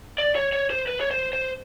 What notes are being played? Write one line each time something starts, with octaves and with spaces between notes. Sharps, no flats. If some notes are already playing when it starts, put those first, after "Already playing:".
D5
C#5
C#5
C5
B4
C#5
C5
C5